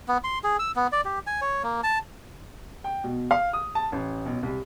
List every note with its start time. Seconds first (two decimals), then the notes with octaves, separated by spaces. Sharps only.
0.08 B3
0.24 C6
0.44 G#4
0.59 E6
0.76 B3
0.92 D5
1.05 G4
1.27 G#5
1.41 C#5
1.63 A#3
1.83 A5
2.84 G5
3.04 B2
3.31 F5
3.53 D#6
3.75 A5
3.92 A1
4.26 B1
4.43 C2